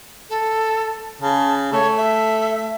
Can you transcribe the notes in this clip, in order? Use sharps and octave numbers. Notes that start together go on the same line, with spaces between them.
A4
C#3 A5
A3 C#5
E5